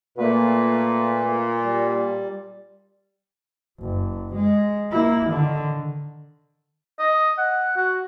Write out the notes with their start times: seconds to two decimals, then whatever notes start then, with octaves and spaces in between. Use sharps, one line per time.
0.18 A#2 A3 A#3 B4
1.62 G3
3.80 F#1
4.35 G#3
4.92 A#3 E4
5.28 D3 D#3
6.99 D#5
7.38 F#5
7.76 F#4